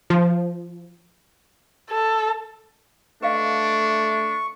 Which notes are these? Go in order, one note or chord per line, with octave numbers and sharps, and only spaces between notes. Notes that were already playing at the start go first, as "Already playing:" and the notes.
F3
A4
A3 D4 B4 D#5 F5 C#6